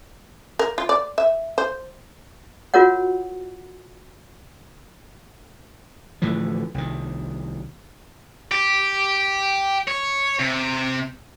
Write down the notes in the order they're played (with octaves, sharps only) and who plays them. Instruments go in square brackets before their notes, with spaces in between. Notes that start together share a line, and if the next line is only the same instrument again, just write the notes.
[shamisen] A#4
F4
D5
E5
C5
[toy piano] F4 F#4 A#4 C#5 F#5
[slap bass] A2 D3 E3 F3
C2 D#3
[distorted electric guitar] G4
C#5
C3